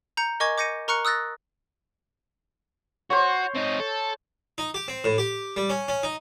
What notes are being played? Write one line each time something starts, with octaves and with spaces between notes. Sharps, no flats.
A#5 G6 C#7
A#4 D#5 G#5 C#6 D6 G#6
D6 G6 A#6 C#7 D#7
A#4 A#5 C#6 F6 F#6 C#7
D#6 E6 F#6 A6 A#6
F#4 C5 C#5
C4 D#4
A4
D#4
G4
C4
A2
G4
G3
C#4
C#4
D#4